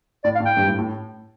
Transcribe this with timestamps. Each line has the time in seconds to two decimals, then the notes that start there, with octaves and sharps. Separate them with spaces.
0.24 A2 D5
0.35 F5
0.40 A2
0.45 G5
0.57 G2
0.68 A2
0.79 A2